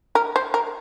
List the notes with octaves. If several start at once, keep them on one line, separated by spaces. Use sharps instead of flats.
A#4
C5
A#4